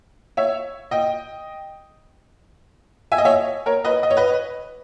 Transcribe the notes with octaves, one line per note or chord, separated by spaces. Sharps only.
C#5 E5
D#5 G5
E5 G#5
D#5
C#5 E5
A#4 C#5
B4 D#5
D#5
C#5
B4 D#5